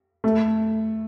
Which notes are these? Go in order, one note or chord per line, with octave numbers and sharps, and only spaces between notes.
A3